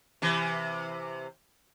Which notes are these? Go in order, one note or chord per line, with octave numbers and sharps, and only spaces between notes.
C3 E3